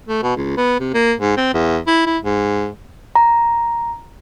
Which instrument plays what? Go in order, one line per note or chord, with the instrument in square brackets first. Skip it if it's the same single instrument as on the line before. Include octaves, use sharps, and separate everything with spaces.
[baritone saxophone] A3
B2
C#2
B3
C3
A#3
G#2
C4
E2
E4
E4
G#2
[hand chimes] A#5